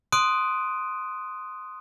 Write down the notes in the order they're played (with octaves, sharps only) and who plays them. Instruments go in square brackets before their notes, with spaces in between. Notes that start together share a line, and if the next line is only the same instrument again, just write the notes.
[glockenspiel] C6 D#6 F#6 D7 D#7